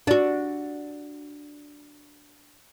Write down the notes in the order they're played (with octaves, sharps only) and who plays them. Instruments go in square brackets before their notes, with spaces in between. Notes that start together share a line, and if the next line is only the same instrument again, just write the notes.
[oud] D4 F#4